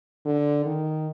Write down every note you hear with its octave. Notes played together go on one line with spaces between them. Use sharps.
D3
D#3